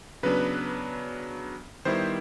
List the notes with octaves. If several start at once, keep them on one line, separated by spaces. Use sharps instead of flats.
C#3 F#3 B3 D4 B4
D#3 G3 B3 E4 C5